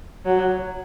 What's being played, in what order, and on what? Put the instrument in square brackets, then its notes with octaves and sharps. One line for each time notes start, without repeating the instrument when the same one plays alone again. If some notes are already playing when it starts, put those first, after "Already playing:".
[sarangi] F#3